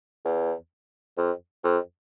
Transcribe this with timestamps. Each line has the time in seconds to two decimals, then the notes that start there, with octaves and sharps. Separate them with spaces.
0.25 E2
1.18 F2
1.64 F2